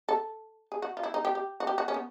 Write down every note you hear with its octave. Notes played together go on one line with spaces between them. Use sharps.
A4
G#4
F#4
F4
E4
D#4
G4
G4
F#4
G4
F#4
C#4
B3